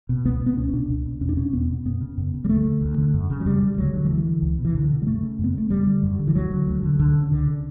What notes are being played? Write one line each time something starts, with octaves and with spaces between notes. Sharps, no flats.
B2
C#2 B3
B2 B3
C#2 C#4
B2 D4
C#2
B2
E2 C#4
D4
B2 C#4
E2 B3
B2
F#2 B3
C#3
F#2
C#3
G3
D2 A3
D3
D2
D3
F#2
C#3
F#3
F#2 G3
C#3
D2 F#3
D3
F#3
D2 E3
D3
C#2
B2
E3
C#2 D3
B2
G3
F#2 A3
C#3
F#2
B3
C#3 A3
F#2 G3
D3
F#2
D3
E3
D2 F#3
D3
D2
D3
C#2 D3
C#3
C#2 D3
C#3